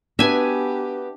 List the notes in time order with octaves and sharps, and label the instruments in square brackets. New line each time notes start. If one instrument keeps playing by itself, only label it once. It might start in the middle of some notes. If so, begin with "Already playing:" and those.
[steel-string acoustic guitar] B3 F#4 B4 [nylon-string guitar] D4 [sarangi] G4 [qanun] E5 G#5